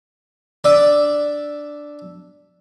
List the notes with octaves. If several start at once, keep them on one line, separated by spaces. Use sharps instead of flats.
D4 D5 E5